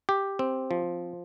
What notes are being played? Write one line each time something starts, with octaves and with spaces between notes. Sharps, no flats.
G4
C4
F3